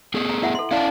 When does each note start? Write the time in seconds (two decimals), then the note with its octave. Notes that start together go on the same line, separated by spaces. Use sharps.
0.14 B3 G#4 A4
0.29 A#5
0.43 E4 E5 F#5
0.55 A4 C6
0.71 C#4 E4 D5 F5 A5